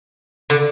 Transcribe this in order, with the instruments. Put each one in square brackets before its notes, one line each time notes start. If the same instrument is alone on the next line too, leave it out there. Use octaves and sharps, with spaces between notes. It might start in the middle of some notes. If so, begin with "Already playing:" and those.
[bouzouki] D3